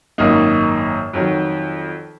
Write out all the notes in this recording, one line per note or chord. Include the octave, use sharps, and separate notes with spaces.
G#1 F#2 D#3 A#3 D#4
F2 D#3 F#3